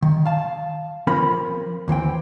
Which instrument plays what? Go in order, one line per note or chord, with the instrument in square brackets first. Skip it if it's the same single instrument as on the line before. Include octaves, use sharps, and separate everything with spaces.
[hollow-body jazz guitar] D#3
F5 A5
F3 C4 A#4 B5
D#2 E3 C4 G5